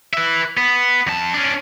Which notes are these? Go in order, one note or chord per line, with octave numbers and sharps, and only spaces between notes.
B4 E5
B3
F2 A5
C#4 D4